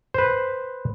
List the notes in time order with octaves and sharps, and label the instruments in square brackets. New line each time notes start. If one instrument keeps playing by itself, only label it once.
[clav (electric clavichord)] B4 C5